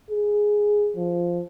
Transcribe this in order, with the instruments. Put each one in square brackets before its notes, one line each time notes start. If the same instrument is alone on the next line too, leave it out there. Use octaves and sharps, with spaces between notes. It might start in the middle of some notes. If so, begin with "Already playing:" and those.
[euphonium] G#4
F3